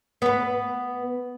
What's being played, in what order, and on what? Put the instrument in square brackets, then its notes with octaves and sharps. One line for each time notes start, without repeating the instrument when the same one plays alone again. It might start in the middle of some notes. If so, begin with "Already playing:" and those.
[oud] B3 B4